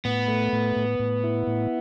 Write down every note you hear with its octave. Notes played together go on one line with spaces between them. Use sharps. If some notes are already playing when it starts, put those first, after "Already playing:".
A2 B3
A3
A2
A2
A2
E4
A2